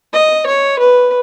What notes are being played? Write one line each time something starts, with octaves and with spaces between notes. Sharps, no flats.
D#5
C#5
B4